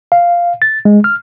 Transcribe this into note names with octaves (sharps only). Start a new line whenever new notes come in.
F5
A6
G#3
F6